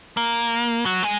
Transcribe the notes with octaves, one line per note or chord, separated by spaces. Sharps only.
A#3
F#3
G#3